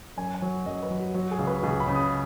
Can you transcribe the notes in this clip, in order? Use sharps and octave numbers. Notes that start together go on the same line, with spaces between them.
F#2 G#5
G#5
F#3
F#2 D#5
B4
F#3
F#4
F#3 F#4
G#4
C#2
B4
C#2 G#4
B5
C#3
D#6